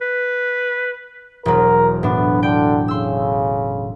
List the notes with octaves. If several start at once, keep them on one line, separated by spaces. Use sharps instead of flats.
B4
E1 F#3 A#4
A2 B3 D4
D3 G5
C#3 C6 E6